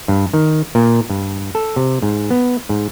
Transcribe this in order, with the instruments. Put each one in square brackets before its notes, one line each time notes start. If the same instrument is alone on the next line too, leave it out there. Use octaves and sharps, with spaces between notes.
[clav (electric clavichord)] G2
D#3
A#2
G2
A4
C3
G#2
B3
G#2